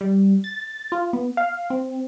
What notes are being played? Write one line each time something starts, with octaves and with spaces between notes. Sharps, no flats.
G3
A6
F4
B3
F5
C4